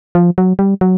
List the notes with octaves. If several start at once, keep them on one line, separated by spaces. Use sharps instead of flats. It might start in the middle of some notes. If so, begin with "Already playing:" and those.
F3
F#3
G3
F#3